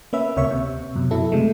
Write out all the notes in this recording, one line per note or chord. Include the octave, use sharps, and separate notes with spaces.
A#3 C#4 B4 E5
D2 C3 C#5 E5 C#6
C3
F#2 B2
F#3 E4 A4
C3 G#3 A3